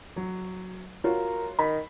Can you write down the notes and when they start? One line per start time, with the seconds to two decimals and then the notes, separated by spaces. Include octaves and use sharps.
0.16 F#3
1.04 F4 F#4 A#4 C#5
1.59 D#3 B5